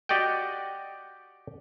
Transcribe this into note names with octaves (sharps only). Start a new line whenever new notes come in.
F#4 G4 D5 D#5 F#5 G5